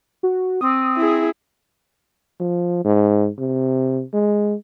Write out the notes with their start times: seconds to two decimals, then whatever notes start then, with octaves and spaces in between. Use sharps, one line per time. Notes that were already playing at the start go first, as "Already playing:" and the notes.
0.23 F#4
0.61 C4 D#6
0.97 E4 G#4
2.40 F3
2.84 G#2
3.38 C3
4.13 G#3